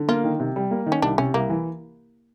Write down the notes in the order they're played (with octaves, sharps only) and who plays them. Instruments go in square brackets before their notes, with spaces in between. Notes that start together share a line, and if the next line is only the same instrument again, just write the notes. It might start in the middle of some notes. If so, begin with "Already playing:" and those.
Already playing: [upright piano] D3
[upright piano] A#3 [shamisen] F4
[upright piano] D#3
C3
G3
A#3
D#3
[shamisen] C#4
[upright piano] C2 [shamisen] D4
[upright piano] C3 [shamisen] C#4
[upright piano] C2 [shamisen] A#3
[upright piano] E3